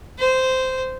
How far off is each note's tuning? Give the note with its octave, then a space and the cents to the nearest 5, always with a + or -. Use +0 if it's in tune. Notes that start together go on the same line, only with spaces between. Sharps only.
C5 -10